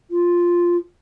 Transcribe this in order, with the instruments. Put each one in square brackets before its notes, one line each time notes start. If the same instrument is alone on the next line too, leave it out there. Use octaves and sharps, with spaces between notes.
[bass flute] F4